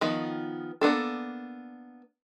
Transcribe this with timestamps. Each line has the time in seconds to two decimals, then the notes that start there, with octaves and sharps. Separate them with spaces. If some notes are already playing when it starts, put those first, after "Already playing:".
0.01 D#3 F3 B3
0.81 A#3 B3 D4 A4